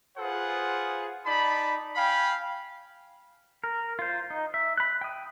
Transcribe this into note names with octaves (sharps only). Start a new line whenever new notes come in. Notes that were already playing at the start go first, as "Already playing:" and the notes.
F4 G#4 B4 C5 F#5
D#4 D5 A5 B5
F5 G5 G#5 B5
A#4
F4 C5
D#4
E5
B5 F#6
G5 D#6